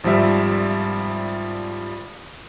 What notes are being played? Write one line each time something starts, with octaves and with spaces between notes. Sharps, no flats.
G#1 F3 G3 E5